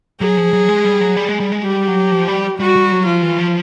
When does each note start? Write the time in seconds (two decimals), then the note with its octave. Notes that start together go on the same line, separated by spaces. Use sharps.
0.20 F#3 G#4
0.37 F3
0.53 F#3
0.69 G#3
0.85 G3
1.01 F#3
1.16 G3
1.29 G#3
1.40 G3
1.52 G#3
1.64 G3 G4
1.88 F#3
2.11 F3
2.28 G3
2.59 G3 F#4
2.76 G3
2.92 F#3
3.06 F3 F4
3.23 E3
3.38 F3